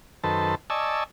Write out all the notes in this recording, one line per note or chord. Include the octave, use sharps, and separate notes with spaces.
F#2 D#3 A4 B4 C5 A5
D5 D#5 G#5 A5 C#6 E6